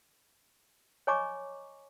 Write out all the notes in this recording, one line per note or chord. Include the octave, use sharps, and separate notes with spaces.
C#5 D#5 G#5 A#5 C#6 D6